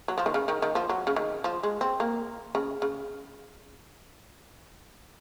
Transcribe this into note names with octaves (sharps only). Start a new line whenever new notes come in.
F#3
F3
D#3
C#3
D#3
D#3
F3
F#3
C#3
D#3
F3
G#3
C4
A#3
C#3
C#3